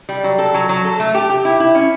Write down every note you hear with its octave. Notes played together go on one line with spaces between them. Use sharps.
G3
F#3
A4
F#3
F#3
A4
A3
G4
G4
E4
E4
C#4